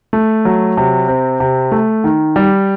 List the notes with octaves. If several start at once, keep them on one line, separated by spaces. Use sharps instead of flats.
A3
F#3
C3
C4
C3
A3
D#3
G3